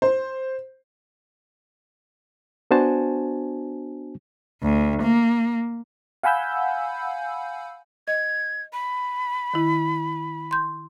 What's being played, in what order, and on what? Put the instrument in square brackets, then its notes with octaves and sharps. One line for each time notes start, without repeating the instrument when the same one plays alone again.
[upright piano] C5
[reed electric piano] B3 D4 F#4 C5 G#5 A5
[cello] D2
A#3
[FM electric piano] F5 F#5 G#5 B5 E6 G6
[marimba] D#5 [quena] G#6
[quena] B5
[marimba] D#3 E4
C6 G6